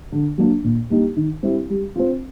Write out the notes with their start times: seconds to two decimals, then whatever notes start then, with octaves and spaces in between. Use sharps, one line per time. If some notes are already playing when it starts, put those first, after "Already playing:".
0.12 D3
0.38 F#3 A#3 D4
0.64 A#2
0.90 G3 A#3 D#4 G4
1.16 D#3
1.43 G3 C4 E4 G4
1.70 G3
1.96 C4 F4